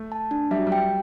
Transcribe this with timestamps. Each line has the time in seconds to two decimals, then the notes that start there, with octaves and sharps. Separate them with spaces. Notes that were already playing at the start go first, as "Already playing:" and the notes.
Already playing: A3
0.12 A5
0.31 D4
0.51 G3 E5
0.58 F#3
0.67 G3
0.72 G5